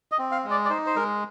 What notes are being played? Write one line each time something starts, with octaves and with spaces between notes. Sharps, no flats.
D#5
C4
F5
G#3
D5
D5
D#4 C5
C5
G#3 A#4